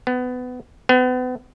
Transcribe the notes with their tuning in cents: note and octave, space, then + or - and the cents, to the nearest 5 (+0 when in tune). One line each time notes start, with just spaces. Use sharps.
B3 +20
B3 +35